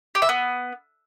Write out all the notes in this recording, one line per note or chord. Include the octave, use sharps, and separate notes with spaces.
G4
E5
B3